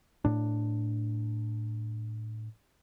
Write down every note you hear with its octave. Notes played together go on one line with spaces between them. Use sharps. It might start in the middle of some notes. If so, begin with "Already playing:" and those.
A2 D4